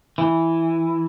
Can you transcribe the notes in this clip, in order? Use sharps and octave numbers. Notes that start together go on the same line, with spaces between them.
E3